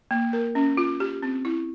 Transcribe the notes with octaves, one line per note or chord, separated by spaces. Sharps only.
A#3
A#4
C#4
F4
G4
C4
E4